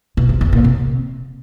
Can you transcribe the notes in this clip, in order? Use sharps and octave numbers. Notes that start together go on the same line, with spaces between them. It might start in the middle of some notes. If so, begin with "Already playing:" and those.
B2
C3
E2
A#2
C3